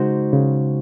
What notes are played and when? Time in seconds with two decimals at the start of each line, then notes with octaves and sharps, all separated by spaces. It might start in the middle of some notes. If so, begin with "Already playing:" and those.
Already playing: C#3 G#3 D#4 F#4 C5
0.33 C#3